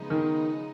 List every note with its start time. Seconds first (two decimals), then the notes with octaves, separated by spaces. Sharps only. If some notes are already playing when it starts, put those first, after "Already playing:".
Already playing: C#3 F3 G#3 B3 D#4
0.10 D#3